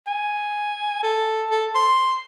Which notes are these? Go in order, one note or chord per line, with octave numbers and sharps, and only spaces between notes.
G#5
A4
A4
C6